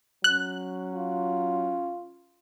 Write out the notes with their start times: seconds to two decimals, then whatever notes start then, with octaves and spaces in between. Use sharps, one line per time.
0.24 F#3 C#4 F#6
0.95 F4